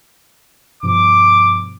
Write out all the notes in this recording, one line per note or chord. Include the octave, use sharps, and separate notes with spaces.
G2 B2 F3 D6